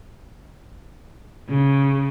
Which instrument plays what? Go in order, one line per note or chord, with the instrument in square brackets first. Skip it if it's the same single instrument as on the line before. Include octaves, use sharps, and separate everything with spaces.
[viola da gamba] C#3